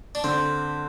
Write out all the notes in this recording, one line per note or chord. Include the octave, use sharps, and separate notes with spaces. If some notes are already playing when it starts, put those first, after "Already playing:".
D4
D3 C4